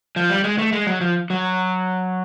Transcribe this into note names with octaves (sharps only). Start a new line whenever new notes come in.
F3
G3
G#3
A3
G#3
F#3
F3
F#3